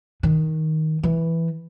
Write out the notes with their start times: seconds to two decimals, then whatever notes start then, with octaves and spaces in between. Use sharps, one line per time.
0.23 D#3
1.03 E3